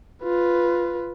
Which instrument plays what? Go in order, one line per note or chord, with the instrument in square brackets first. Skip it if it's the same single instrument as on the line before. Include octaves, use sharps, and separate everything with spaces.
[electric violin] F4 B4